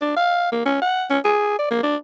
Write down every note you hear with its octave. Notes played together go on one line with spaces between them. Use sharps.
D4
F5
A#3
C#4
F#5
C#4
G#4
D5
A#3
D4